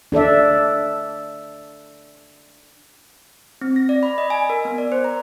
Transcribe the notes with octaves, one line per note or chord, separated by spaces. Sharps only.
D4 A4 D5 E5
C4
A#6
D5
B5
D#5
G#5
A#4
B3
D5
C5
A#5